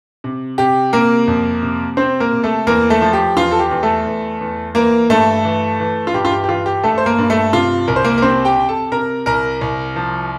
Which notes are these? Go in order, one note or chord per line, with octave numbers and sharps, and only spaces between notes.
C3
C3 G4
C3 A#3 A#4
F2
C3
C3 C4 C5
A#3 A#4
C3
A3 A4
E2 A#3 A#4
A3 A4
F3
G4
E2 F4
A4
G4
E2
A3 A4
E2
E2
E3 A#3 A#4
G2 A3 A4
E3
E3
F4
G2 G4
F4
G4
G4
E3 F4
G4
G2 A3 A4
C5
A#3 A#4
G2
A3 A4
C3 F4
C2 A#4
C5
A#3 A#4
A#4
C3 C4 C5
G4 G5
C3
A4 A5
C3 A#4 A#5
C2 A#4 A#5
C2
F3